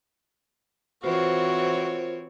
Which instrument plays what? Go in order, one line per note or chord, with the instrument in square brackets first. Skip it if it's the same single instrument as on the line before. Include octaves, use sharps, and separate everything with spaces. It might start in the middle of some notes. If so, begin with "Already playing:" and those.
[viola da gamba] E3 C4 C#5 [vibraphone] F4 A#4 C5 [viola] F#4